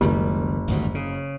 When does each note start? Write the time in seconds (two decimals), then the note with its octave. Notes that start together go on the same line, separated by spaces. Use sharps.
0.01 F#1 C#2 D#3 G3
0.67 G#1 D2 G2
0.95 C#3